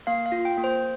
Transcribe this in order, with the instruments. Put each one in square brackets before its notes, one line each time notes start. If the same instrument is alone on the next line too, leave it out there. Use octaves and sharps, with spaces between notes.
[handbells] A#3 F5
F5
F4
G5
A#3
C5